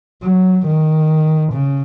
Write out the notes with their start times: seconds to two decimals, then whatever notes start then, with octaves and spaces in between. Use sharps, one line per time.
0.23 F#3
0.67 D#3
1.53 C#3